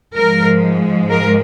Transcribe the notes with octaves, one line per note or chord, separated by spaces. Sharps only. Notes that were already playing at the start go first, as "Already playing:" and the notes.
G#2 F3 G#3 A#4
A#4